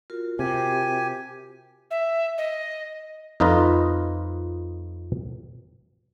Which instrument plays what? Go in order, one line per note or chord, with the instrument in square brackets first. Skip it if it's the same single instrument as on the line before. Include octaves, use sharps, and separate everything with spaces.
[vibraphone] F4 F#4 A#4
[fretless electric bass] C3 [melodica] G4 G#5
[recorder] E5
D#5
[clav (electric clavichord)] F2 D#4 F4 B4 D#5